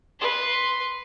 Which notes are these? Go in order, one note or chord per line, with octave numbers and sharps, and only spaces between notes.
B4 C6